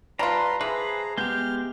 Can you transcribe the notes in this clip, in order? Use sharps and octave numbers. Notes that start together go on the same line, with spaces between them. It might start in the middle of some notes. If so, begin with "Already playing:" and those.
G3 F4 B4 A5 A#5 C6
E3 G#4 B4 C5 A#5
G#3 B3 G4 F6 G6